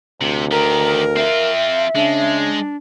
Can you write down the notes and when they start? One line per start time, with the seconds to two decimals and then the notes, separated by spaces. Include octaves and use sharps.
0.21 D2 C3
0.52 D#3 G4 A#4 A#5
1.16 C4 F4 E5
1.95 C#3 G#3 D4